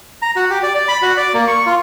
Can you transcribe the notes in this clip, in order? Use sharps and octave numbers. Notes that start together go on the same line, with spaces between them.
A#5
F#4
G4
D5
D5
B5
F#4
D5
A#3
C#6
F4